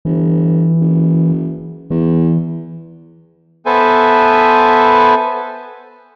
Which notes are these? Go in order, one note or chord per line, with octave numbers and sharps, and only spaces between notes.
G1 E3
F#1
E2 E3
B3 A4 B4 C5 E5 G#5